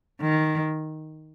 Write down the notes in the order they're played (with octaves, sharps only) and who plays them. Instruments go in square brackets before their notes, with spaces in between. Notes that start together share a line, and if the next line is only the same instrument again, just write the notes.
[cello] D#3